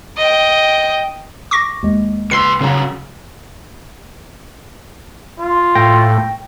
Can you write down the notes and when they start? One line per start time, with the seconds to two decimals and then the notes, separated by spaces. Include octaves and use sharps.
0.17 D#5 G5
1.51 C#6 D6 A#6
1.83 D#2 G#3
2.31 C#2 B4 C6 E6 C7
2.60 G2 C#3 F#3 F5 A#5
5.39 F4
5.75 A2 G5 A#6